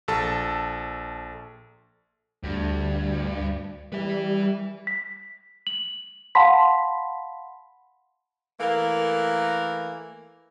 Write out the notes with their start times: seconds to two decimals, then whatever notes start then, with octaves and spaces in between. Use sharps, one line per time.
0.08 A#1 A4 A5
2.43 D2 G2
3.93 G3 B4 E5
4.87 B6
5.67 F#7
6.35 F5 F#5 A5 B5 C6 B6
8.60 E3 A3 A#3 A#4